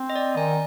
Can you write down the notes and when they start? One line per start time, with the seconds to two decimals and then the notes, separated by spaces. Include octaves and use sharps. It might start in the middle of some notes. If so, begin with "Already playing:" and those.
Already playing: C4
0.10 D#5
0.16 D5
0.37 D#3 G#5